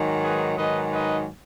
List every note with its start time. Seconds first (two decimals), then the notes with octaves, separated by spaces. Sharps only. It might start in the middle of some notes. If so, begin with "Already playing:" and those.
Already playing: G#2 D#3 F#3
0.23 G#4 B4
0.57 G#2 D#3 F#3 B4 D#5
0.92 B4 D#5